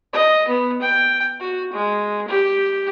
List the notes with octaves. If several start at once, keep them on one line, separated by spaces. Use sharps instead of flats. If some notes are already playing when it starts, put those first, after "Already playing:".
D#5
B3
G5
F#4
G#3
G4